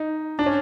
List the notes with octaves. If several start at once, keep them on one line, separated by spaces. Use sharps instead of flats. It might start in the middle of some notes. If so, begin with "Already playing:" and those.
Already playing: D#4
D4
C#4